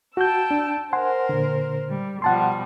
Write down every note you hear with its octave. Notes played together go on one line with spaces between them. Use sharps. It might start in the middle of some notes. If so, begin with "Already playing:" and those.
F#4 G5 A5 E6 G6
D4
A#4 C5 F#5 G#5 C6
A#2 D3
G3
B2 F3 G3 F#5 A5 C6